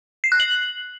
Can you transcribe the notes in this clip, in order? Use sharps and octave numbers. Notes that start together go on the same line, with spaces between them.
C7
F#6
F#7